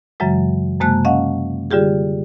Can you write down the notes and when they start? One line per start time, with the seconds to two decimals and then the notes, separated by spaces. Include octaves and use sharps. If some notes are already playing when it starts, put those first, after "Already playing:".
0.20 F#2 C#3 E3 F#3 G#3
0.81 F#2 C3 G#3 A#3 A5 F#6
1.05 C#4 D#5 F5 F#5
1.71 D3 G3 F4 G4 G#4